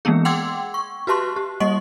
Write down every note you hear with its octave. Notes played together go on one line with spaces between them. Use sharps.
E3 G#3 A#3 B3 G#4
F#5 G5 C6 D6 E6 G#6
C#6
F#4 G4 B4 A5 C6 C#6
G4
G3 A#3 D#5 C#6 F#7